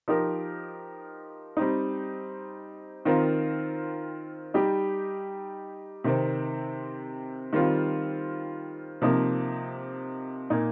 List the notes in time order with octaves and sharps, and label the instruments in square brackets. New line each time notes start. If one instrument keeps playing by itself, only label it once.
[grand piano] F3 D#4 G4 A#4
G3 C4 D#4
D#3 C4 F4 A#4
G3 D#4 G4
C3 D#3 C4
D#3 G3 C4 F4
C3 F3 A#3 D#4
A#2 A#3 D#4